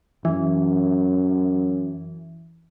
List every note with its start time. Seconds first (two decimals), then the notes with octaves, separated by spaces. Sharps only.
0.25 F#2 E3